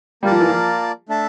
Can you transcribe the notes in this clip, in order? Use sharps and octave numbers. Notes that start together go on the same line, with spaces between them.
G3 A#3 F4 A#4 D5 A5
F3
E3
F3
A3 D4 A4 E5 A5